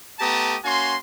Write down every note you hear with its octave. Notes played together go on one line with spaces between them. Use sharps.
A3 B3 G4 A5 A#5 D#6
A#3 C#4 F#4 G#5 C6